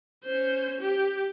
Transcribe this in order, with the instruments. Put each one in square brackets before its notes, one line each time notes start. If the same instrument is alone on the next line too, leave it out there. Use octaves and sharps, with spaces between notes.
[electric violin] C#4 C5
G4